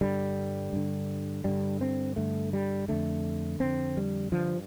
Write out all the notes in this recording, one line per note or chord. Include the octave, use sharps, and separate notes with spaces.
G2 D3 G3
G2 D3
G2 D3 G3
C4
G2 D3 A3
G3
F2 D3 A3
F2 D3 C4
G3
G2 D3 F3